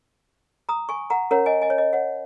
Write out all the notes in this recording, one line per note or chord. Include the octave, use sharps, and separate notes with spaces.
A#5 D#6
G#5 C#6
F#5 A#5
C#4 A#4 C#5 F#5 A#5
D#5 G#5
D#5 G#5
C#5
D#5
C#5 F#5